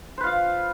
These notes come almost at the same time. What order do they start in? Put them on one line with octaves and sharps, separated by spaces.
C5 B4 F4 F5